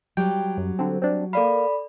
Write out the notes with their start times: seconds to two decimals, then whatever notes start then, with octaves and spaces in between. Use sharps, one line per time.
0.17 F#3 G3 G5
0.58 F#2
0.79 D3 C4
1.02 C4 D4
1.33 A#3 A4 D5 F5 B5